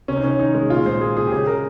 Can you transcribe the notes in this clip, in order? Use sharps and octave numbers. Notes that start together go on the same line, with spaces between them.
C3 C#4
D#4
C3 C#4
D#3 D#4
G#3
A#2 F4
G#3 C5
G#3 G#4
A#2 G#4
G4
C#3 G#4
C#3 A#4